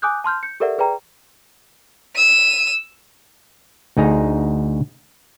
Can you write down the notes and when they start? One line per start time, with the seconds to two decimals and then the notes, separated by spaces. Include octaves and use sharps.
0.02 G#5 D6 D#6 F#6 G6
0.24 A5 C6 F6 G6
0.43 G6 C#7
0.60 G4 A4 A#4 D5 E5 F#5
0.78 G#4 B4 D5 G5 A#5
2.16 E6 D#7
3.97 D2 D#4 G#4 A#5